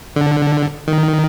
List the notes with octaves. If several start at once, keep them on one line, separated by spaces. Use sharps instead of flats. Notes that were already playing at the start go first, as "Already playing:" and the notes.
D3
D#3